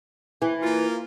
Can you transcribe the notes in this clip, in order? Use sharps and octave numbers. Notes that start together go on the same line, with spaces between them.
E3
A#3 F4